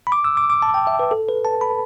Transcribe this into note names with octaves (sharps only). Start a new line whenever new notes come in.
B5
D6
E6
D6
D6
A5
G5
E5
B4
A4
B4
A5
B5